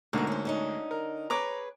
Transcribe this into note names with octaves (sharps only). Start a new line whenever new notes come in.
D2 G#2 D3 A#3 B3
C#4 C5
D3 C#4 D#4
A#4
G#4 B4 C#5 A#5 D6